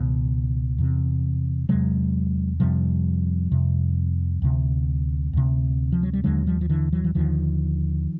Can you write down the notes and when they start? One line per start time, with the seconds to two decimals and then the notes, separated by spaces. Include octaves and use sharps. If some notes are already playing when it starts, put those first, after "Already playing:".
Already playing: C#2 B2 D#3
0.78 E2 C3
1.69 E2 C3 F#3 G#3
2.60 F2 C3 F3 G3
3.52 F2 C3
4.42 D2 C3
5.33 D2 C3
5.92 F3
6.03 F#3
6.13 G3
6.24 D#2 D3 F#3 G#3
6.46 F3 G3
6.61 F3
6.69 D3 E3
6.93 E3 F#3
7.04 E3
7.15 D#2 D3 D#3 F3